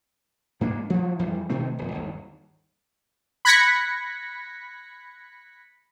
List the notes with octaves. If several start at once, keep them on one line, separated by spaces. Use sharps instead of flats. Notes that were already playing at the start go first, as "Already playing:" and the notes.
G#2 A#3 C#4 D4
F3 F#3
F2 E3 G3
B2 D#3 A3 C4
D#1 F2
G1 D#2
B5 F#6 G#6 A#6 B6 C#7